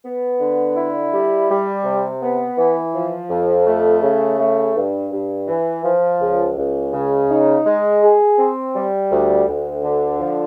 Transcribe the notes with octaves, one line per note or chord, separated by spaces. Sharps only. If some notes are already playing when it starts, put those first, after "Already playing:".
B3
D3
E4
G3
G3
C3
B3
E3
F3
F2
A3
C#3
A3
G2
G2
E3
F3
C#2
C#2
C#3
D#4
G#3
G#4
C4
G3
D2
D2
D3
F3